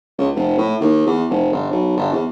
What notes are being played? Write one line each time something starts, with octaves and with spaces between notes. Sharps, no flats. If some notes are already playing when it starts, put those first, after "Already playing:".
C#2
F1
A2
D#2
E2
F1
G1
B1
G1
E2